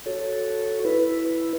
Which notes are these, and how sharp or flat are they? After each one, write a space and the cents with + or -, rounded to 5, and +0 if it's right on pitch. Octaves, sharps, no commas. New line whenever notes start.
F#4 +0 A4 +0 C#5 +0
E4 +0 B4 +0